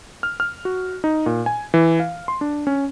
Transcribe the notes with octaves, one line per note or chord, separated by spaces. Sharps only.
F6
F6
F#4
D#4
A#2
G#5
E3
F5
C6
D4
C#4